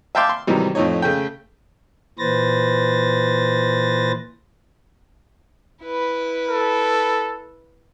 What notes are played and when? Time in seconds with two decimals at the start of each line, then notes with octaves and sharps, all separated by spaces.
0.15 E5 F5 G5 A5 C6 D6
0.29 C6
0.47 G#2 C3 D#3 E3 F#3 G3
0.75 F2 A2 A3 D#4 C#5
1.02 C#3 A3 G5
2.19 A#2 E3 B4 C5 A6 A#6
5.83 E4 B4
6.50 A4